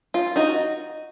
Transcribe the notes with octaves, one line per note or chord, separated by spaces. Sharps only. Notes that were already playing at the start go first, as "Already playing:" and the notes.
F4
D#4 F#4